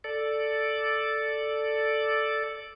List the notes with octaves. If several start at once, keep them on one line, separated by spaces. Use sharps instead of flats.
A4 D5